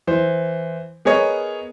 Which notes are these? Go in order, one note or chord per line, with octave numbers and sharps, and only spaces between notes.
E3 C5
B3 G#4 A#4 C#5 D#5